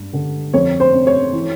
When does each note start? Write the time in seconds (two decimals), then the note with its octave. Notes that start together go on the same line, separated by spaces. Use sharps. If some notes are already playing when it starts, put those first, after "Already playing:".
Already playing: G2
0.13 D3
0.54 F2 C#5
0.80 C5
0.94 C3
1.07 C#5
1.33 E3